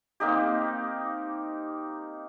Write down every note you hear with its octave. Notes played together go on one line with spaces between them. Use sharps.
A#3 C4 D#4 G4